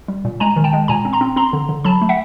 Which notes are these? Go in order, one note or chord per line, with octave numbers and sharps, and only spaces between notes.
G3
A#2
G#3 G#5 A#5
D#3
G5 A5
G#3
A#2 G#5 A#5
C4
A#5 C6
C4
C4 A#5 C6
D3
D3
F#3 A5 B5
A3
E5 F#5